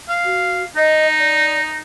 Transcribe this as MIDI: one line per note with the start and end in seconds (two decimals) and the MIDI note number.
0.09 0.63 77
0.24 0.63 66
0.76 1.80 63
0.76 1.06 75
1.19 1.57 74